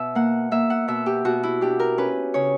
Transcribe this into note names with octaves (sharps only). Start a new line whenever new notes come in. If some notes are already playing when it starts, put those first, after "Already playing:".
Already playing: B2 E5
A#3 F#5
A#3 E5
F#5
B2 E5
G4
B2 F#4
E4
D4 G4
A#4
C#4 B4
C#3 C#5